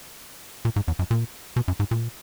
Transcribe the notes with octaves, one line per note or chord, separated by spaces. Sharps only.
A#2
G#2
E2
F#2
A#2
B2
F#2
G#2
A#2